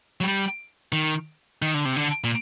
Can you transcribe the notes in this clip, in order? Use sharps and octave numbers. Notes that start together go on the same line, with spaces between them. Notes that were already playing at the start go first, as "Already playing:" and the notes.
F#3
G3
D#3
D#3
D3
C3
D3
A#2